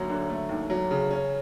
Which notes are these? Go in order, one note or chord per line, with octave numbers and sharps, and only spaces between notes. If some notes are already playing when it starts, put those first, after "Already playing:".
Already playing: D2 F#3 A#3
D3
A3
D#2
F#3
C#3
C#4